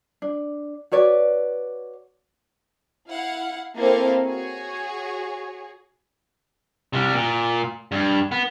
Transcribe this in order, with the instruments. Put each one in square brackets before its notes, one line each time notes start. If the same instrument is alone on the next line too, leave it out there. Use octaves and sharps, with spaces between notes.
[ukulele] D4
F#4 B4 C#5 D5
[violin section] E4 F5 F#5
A#3 C4 E4 A4 D#5 F5
F#4 G#4 C#5
[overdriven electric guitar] C3 G3
A#2
G2
B3